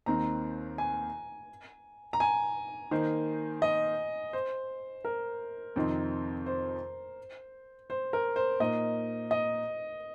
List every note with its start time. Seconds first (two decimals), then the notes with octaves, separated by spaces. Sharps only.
0.06 D#2 D#3 C4 D#4 A#5
0.78 G#5
2.13 A#5
2.20 G#5
2.91 D#3 A#3 D#4 C5
3.62 D#5
4.33 C5
5.04 A#4
5.76 F2 C3 D#3 C4 D#4
6.46 C5
7.90 C5
8.13 A#4
8.36 C5
8.60 A#2 A#3 D#4 D#5
9.31 D#5